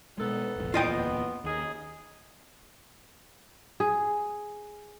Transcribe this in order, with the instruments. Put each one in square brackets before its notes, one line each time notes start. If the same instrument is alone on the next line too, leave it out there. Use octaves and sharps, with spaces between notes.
[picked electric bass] B2 G#3 [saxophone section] D#3 B3 A4
[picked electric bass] F1 A#1
[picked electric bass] D1 E2 A#2 [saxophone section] B3 [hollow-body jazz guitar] F4 D#5 G5
[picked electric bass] D#2 [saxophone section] C#3 D#4 G#4
[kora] G#4